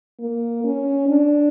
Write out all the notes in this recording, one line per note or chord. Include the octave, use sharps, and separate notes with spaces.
A#3
C#4
D4